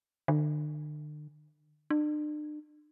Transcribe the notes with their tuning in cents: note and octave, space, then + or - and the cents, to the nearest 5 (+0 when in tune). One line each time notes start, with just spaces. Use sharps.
D3 +40
D4 +40